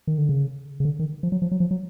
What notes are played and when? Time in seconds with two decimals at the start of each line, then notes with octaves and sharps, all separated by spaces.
0.07 D#3
0.18 D3
0.29 C#3
0.80 C#3
0.85 D3
0.99 D#3
1.23 F3
1.32 F#3
1.42 F3
1.51 F#3
1.60 F3
1.71 F#3